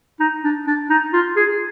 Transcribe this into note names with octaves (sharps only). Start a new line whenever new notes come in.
D#4
D4
D4
D#4
F4
G#4